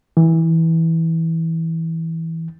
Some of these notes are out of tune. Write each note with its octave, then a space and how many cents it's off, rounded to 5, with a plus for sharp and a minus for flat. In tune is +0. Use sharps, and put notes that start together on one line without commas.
E3 -15